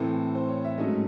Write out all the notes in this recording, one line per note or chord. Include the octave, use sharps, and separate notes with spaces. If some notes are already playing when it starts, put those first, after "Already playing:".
Already playing: A2 E3 C4 A4
C5
C#5
E5
G#2 F#3 A3 C#4 D#5